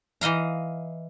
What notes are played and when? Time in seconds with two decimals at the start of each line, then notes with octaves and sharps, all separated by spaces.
0.21 E3 D#5 F5 A#5